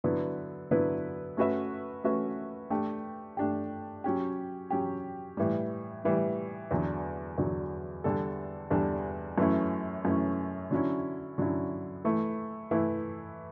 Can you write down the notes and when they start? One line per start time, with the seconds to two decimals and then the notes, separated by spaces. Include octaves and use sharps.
0.04 D3 F#3 B3 E4 B4
0.71 D3 F#3 B3 E4 B4
1.37 A3 C#4 F#4 B4 E5
2.04 A3 C#4 F#4 B4 E5
2.70 A3 D4 G4
3.37 A3 D4 G4
4.04 F#3 C#4 G4
4.70 F#3 C#4 G4
5.37 A2 E3 G3
6.04 A2 E3 G3
6.71 E2 D3 F#3
7.38 E2 D3 F#3
8.04 E2 D3 G3 D4 A4
8.70 E2 D3 G3 D4 A4
9.38 F#2 E3 A3 C#4 E4
10.05 F#2 E3 A3 C#4 E4
10.71 D3 F#3 C#4 E4
11.38 D3 F#3 C#4 E4
12.04 E3 A3 E4
12.71 E3 A3 E4